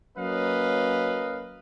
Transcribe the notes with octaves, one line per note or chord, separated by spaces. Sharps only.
F#3 A#3 C#4 B4 D#5 F5